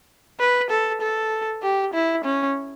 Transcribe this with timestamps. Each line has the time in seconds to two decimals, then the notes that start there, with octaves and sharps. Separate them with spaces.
0.40 B4
0.70 A4
1.01 A4
1.63 G4
1.94 E4
2.24 C#4